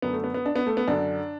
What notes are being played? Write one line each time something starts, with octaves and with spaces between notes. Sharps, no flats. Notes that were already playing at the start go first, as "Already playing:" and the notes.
F#2 D3 B3
A3
B3
B3
D4
B3
A3
B3
F#2 D3 D4